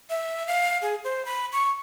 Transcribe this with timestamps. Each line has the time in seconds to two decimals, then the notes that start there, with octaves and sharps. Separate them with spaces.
0.10 E5
0.47 F5
0.82 G#4
1.04 C5
1.25 B5
1.52 C#6